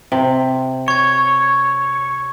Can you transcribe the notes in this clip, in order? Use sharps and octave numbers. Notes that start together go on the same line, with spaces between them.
C3
C#5 C#6 G#6